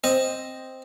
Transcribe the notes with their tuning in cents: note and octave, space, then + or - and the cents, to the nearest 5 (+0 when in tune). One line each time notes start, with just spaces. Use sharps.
C4 +0 D#5 +0